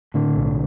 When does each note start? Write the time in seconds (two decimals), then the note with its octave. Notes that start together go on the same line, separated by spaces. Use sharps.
0.14 A2 D3
0.36 B1